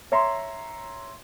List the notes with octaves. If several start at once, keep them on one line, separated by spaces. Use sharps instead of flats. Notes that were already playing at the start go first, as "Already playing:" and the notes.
C#5 E5 A#5 C6